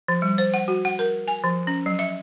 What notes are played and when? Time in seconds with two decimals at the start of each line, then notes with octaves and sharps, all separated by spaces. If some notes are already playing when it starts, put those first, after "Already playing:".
0.08 F3
0.22 G3
0.38 C5
0.54 F#5
0.68 F#4
0.85 F#5
0.99 A#4
1.28 G#5
1.44 F3
1.67 C#4
1.86 F#3
1.99 E5